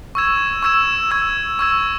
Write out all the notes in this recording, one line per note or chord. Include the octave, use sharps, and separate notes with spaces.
C#6 E6 G#6 E7
C#6 E6 G#6 E7
C#6 E6 G#6 E7
C#6 E6 G#6 E7